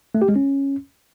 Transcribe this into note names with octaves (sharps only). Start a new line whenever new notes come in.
A3
G4
G#3
C#4